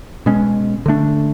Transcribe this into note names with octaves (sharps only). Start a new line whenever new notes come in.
B2 G#3 C#4
D3 A3 D4